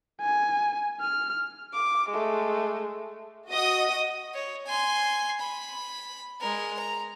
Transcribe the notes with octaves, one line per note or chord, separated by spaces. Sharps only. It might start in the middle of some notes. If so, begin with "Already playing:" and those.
G#5
F6
D6
G#3 A3
F#4 D#5 D#6
C#5
G#5 C6
B5
G#3 A#4
A#5